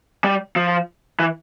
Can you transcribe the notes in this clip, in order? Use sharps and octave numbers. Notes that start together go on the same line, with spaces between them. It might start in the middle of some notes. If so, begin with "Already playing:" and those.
G3
F3
E3